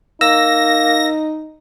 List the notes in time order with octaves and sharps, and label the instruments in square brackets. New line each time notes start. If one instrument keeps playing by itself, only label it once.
[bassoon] A#3 [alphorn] D#4 [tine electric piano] E6 [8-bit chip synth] A#6